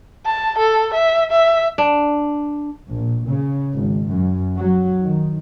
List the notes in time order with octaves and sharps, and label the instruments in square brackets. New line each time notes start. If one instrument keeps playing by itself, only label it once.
[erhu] A5
A4
E5
E5
[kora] D4
[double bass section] A#1
C#3
G#1
F#2
F#3
D#3